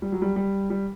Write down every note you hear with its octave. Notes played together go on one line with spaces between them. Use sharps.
G3
F#3
G3
G3
G3